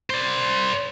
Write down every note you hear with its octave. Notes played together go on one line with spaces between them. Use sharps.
C5 D5